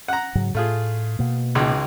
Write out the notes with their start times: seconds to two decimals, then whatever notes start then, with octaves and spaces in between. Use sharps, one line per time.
0.08 F#5 A#5
0.35 G#2 C#3 F#3
0.55 A2 A3 F4 G#4
1.19 B2 A#3
1.55 G#1 C#2 G#3